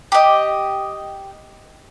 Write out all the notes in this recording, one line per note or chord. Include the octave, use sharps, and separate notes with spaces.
G4 D#5